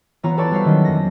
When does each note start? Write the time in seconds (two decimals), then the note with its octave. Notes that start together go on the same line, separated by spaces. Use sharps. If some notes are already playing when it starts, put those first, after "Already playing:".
0.23 E3 B3 F4 C#5 A#5
0.37 A4 B4 C#5 D5 A5 C#6
0.51 G3 F#4 C5 E5 F5
0.65 D#3 F#3 C#4
0.85 F2 A#3 A#6